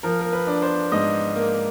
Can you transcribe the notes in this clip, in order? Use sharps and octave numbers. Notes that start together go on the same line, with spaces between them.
F3 A#4
A#4
B4
D4
C5
G#2 D#5
A#3